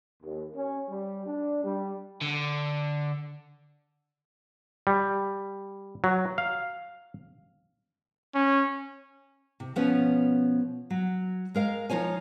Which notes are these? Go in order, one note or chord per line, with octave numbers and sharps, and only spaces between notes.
D#2
C#4
G3
D4
G3
D3
G3
F#3
F5
C#4
C3
B2 F3 B3 C#4 C#5
F#3
G#3 A#4 F5
F3 D#4 F4 C#5 G#5